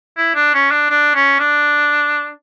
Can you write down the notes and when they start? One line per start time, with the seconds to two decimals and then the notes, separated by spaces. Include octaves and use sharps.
0.17 E4
0.35 D4
0.54 C#4
0.71 D4
0.90 D4
1.15 C#4
1.39 D4